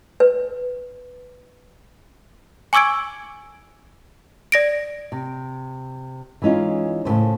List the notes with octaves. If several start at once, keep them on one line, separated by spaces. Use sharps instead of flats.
B4
G#5 C#6 D6 E6 G#6 D7
D5 A#6 D7
C3
E3 G#3 C#4 D#4 F4
A2 C#3 E3 C5